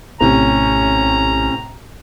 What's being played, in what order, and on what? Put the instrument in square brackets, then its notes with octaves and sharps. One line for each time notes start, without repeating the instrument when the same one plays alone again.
[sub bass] A#1 [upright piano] A2 C3 [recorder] C#4 [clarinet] A#5